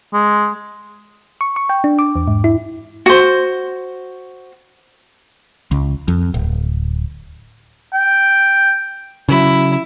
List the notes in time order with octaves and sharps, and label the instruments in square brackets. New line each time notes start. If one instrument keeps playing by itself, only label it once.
[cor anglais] G#3
[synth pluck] C#6
C#6
G5
D4
D6
E2
G#2
E4
[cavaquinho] F#4 C5
[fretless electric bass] C#2
F2
D1
[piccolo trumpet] G5
[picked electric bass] C#3 F#3 [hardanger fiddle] E4